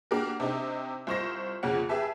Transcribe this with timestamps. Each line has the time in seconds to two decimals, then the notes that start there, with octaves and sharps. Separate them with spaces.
0.11 A#3 D4 F#4 G4 A#4
0.40 C3 D4 D#4 G4
1.07 C2 F4 C5 D#5 C#6 A#6
1.63 F2 C#3 A#3 C#4 F#5
1.89 G4 G#4 B4 E5 A5